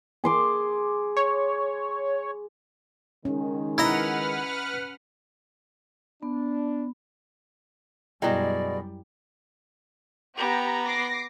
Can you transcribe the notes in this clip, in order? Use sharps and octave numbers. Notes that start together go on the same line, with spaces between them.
G#4 C6 D6
C#5
D#3 G#3 C#4
E4 B4 D#5 F#5 A#5 F6
B3 D4
F#2 B2 G3 G#3 E4 D5 G5
B3 G4 A#5
D6 A#6 C7